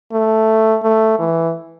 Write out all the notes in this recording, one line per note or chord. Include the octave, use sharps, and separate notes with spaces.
A3
A3
E3